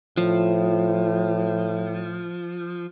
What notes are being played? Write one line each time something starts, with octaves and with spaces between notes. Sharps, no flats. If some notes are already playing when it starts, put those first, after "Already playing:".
A2 F3